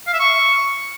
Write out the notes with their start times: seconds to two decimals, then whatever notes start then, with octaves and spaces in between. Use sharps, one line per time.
0.07 F5
0.13 E5
0.20 C#6